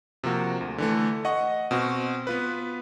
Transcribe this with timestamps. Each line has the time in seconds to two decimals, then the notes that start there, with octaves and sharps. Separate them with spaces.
0.24 C3 F3 A#3 F#4
0.61 D2
0.78 D3 E3 A3
1.25 D#5 F#5 C#6
1.71 B2 C4 F#4
2.27 B3 F4 B4